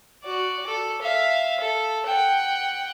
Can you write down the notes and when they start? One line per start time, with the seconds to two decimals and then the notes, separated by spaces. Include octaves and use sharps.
0.23 F#4 D5
0.67 A4
1.02 E5 F5
1.60 A4
2.06 F#5 G5